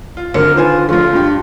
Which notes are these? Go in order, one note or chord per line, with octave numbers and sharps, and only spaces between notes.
F4
G#1 D3 A#4
D#3 F4 B4 C5 G#5
A1 F3 A3 F4
G2 D4 G4